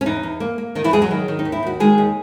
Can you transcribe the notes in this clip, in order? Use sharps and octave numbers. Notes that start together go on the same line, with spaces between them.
C#4
E2 D#4
E2
A#3
A#3
D#3 D#4
E3 E4
E2 G#3 G#4
F#3 F#4
D#3
D#3
D#4
D#2
E4
D#2 F#4
D#3 G#3 G#4
D#2